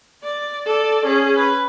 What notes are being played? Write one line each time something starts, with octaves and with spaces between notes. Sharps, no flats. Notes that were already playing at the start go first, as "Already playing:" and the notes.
D5
A4 D5
C#4 G#4
B4